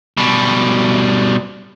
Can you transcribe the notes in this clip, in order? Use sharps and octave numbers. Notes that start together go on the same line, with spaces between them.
B2 G3